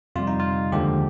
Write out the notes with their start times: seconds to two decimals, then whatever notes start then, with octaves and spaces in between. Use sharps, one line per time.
0.16 F2 C3 G3 F4
0.27 D#4
0.40 F4
0.72 D#2 D3 F3 G#3 G4